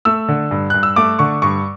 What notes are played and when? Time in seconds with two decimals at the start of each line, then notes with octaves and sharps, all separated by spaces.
0.05 A3 E6
0.28 D3
0.51 G2
0.70 G2 F#6
0.83 E6
0.96 A3 D6
1.19 D3 C#6
1.42 G2 C#6